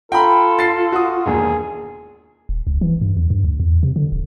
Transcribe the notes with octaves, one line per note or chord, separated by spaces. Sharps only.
F4 A4 G5 A#5 B5
A6 C7
F#4 D#6
E1 D#2 G#4
D#1
C#2
E3
G2
E2
G2
D2
E2
C3
D3
D1